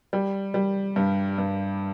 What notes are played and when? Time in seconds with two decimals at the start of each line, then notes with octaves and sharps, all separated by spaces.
0.13 G3
0.54 G3
0.96 G2
1.38 G2